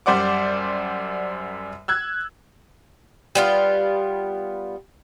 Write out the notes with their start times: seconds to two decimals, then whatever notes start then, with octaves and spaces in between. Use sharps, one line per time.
0.06 F#2 G3 C5 D5 F#5 D6
1.88 E6 F#6 G#6
3.35 G3 B3 F4